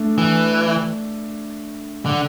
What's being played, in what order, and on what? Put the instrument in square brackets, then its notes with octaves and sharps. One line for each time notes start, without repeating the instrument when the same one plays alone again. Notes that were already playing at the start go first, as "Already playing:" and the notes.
Already playing: [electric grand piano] A3 D4
[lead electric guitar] E3
D3